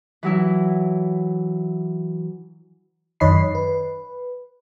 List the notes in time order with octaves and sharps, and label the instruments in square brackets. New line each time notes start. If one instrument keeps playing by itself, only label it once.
[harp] E3 F#3 E4
[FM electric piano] F#2 D#3 C#5 D#5 B5 C7
B4